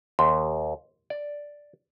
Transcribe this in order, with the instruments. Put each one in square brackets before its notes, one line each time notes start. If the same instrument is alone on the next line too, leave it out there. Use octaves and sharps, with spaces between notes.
[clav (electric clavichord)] D#2 [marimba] C6
[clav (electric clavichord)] D5